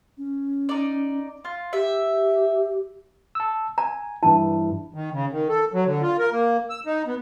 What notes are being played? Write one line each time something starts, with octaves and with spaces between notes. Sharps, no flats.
C#4
D#4 D5
F4
G4 E5
A5 E6
G#5 A#5
G2 E3 E4 A5
D#3
C#3
D#3
A4
F#3
D3
F4
A#4
A#3
E6
D#4
B3